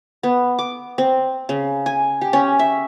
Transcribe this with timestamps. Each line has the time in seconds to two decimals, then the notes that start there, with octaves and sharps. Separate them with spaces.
0.23 B3
0.59 D6
0.98 C4
1.49 C#3
1.86 G#5
2.21 G4
2.33 C#4
2.59 E5